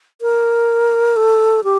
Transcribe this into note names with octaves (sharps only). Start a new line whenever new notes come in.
A#4
A4
G4